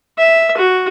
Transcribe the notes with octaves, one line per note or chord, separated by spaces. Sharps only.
E5
F#4